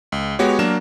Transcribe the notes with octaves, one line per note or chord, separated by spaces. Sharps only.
C#2
G#3 B3 F#4 G4 C#5
F#3 A#3 D4 A#4 E7